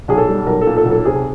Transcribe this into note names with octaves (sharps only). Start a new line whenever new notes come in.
B1 G#4
A4
G3
B1 A#4
A4
A#2
A4
B1
A4
C3 G#4